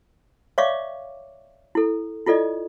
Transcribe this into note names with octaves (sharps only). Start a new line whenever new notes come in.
C#5 D5 E5 F5 C#6 D6
E4 A4
E4 F4 A4 D5 D#5